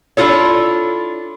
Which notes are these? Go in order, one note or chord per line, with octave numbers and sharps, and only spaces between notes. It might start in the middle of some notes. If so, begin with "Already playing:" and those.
D4 E4 F4 A4 C#5